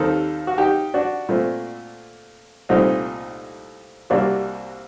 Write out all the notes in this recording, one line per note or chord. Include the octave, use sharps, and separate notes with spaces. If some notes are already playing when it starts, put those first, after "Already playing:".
Already playing: D#2 D#3 G3 C4 A4 C5
F#4
D#4 G4
D4 F#4
A#2 A3 C4
C2 A#2 A3 C4 D#4
C2 C3 G3 A#3 D4 F#4